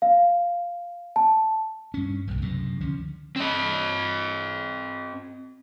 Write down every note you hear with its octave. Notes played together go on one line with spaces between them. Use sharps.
F5
A5
G2 C#4
D1 B1
C#2 F#2 A2 C3
D3 F3 C#4
C4 D#5